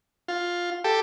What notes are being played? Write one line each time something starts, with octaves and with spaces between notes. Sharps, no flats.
F4
G4 A4